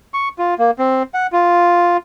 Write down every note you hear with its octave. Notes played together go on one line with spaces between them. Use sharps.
C#6
F4
A#3
C4
F#5
F4